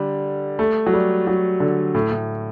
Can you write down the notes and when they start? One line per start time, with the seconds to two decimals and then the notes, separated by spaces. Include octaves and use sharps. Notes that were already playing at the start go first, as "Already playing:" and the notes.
Already playing: D3 G3
0.59 A3
0.87 F#3
0.93 G3
1.27 F#3
1.60 D3
1.95 A2
2.12 A2